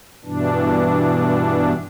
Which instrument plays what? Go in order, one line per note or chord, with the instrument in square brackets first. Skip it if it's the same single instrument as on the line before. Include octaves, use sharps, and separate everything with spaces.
[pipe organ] G2 B2 E3 D4